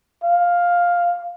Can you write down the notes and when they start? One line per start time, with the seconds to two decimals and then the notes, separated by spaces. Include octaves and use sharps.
0.24 F5